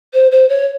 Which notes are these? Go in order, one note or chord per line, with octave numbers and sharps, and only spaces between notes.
C5
C5
C#5